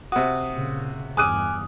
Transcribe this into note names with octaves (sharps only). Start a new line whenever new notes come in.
C3 F#4 D#6
A#2 C#3
E2 G2 G#5 D6 D#6 F6 F#6 D#7